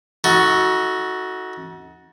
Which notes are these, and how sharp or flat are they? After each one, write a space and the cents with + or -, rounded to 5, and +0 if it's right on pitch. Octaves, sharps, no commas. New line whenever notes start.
D#4 +40 F#4 +0 A4 +0